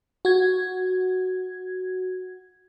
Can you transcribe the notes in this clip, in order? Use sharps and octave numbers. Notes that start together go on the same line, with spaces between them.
F#4 G#6